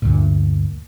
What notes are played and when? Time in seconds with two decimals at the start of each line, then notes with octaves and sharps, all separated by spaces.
0.02 D2 G2 A#2